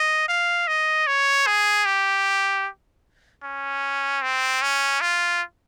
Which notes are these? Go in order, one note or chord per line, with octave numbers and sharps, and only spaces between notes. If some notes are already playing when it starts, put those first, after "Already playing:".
Already playing: D#5
F5
D#5
C#5
G#4
G4
C#4
C4
C#4
F4